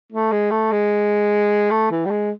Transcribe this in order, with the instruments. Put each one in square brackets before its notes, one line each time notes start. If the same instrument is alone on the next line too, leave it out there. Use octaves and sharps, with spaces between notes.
[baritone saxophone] A3
G#3
A3
G#3
A3
E3
G3
G#3